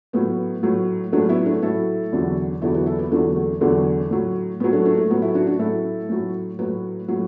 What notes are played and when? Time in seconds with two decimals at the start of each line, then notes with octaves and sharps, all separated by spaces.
0.13 A2 F#3 B3
0.63 A2 F#3
1.12 A2 F#3 A3 D4
1.29 B3 E4
1.46 A3 D4
1.62 A2 F#3 E4 A4
2.12 E2 D3 F#3
2.61 E2 D3 F#3 E4 A4
2.74 F#4 B4
2.86 E4 A4
2.99 B3 E4
3.11 E2 D3 F#3 A3 D4
3.36 A3
3.61 E2 D3 F#3 A3
4.11 A2 F#3
4.60 A2 F#3 B3
4.73 A3 D4
4.85 A3 D4
4.98 A3
5.10 A2 F#3 B3
5.22 E4 A4
5.35 D4 F#4
5.47 D4 F#4
5.59 A2 F#3 E4 A4
6.09 A2 F#3
6.59 A2 F#3 F#4 B4
7.08 A2 F#3